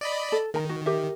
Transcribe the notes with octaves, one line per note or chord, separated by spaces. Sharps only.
D5 D#5 B5
A4
D#3 A#4 A#5
F#4
G4 A#4 E5